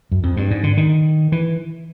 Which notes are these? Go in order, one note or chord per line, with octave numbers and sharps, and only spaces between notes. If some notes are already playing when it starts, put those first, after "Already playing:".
F#2
F2
G2
G#2
D3
D#3
E3